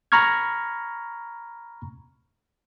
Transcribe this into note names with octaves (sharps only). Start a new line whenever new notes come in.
A#5 B5 C#6 F6 G#6